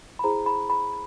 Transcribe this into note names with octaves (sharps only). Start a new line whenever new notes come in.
B5
E4 G#4 C5 A#5
B5
B5